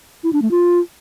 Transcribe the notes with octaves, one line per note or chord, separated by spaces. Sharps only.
E4
D4
A3
F4